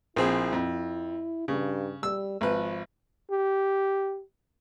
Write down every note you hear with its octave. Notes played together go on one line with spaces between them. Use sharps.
A#1 C4 E4 G#4
F2
G2 C#3
G3 E6
G#1 F3 B4
G4